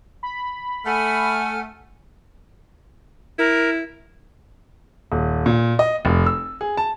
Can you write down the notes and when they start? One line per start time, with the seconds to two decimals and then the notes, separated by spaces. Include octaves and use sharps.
0.23 B5
0.85 A3 F#5 G#5 F6
3.39 E4 A#4
5.12 D#1
5.46 A#2
5.79 D#5
6.05 F1
6.26 E6
6.61 G#4
6.77 A5